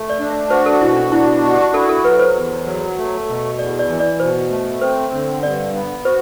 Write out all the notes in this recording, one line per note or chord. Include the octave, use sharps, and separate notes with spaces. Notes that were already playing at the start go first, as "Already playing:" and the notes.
Already playing: A3
D5
D4
E5
F#4 C5
A4
B2 E4
D4
D4 E4
E4
F#4
G4
E4 A4
A4
F#3 B4
C5
E2
F#3
A3
B2
E2 D5
D5
E3
D5
B2 C5
A3
C4 C5
D3
G2 D5
B3
F#4 C5